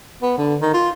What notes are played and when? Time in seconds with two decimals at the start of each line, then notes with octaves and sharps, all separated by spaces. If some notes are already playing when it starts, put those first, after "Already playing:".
0.22 B3
0.38 D3
0.61 D#3
0.74 F4